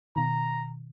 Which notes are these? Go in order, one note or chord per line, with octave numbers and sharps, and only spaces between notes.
B2 D#3 A#5